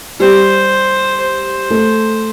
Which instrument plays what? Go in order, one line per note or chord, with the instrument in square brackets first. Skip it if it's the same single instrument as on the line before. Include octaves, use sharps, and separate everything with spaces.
[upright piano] G3 G4 [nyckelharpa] C5
[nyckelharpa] C5
[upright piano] A3 A4